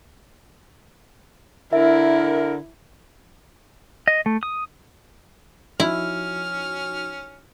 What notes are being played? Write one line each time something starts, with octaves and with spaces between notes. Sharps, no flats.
D3 E4 A#4 E5
D#5
A3
D#6
F3 C#4 D#4 E4 F#4 F6